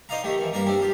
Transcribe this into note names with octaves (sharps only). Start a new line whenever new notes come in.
D#4 C5 D5 D#5 F5 A#5
D#3 A3 G4
D#3 E3
G2 A#3 D5 A#5
G3 C4 D4
F4 G4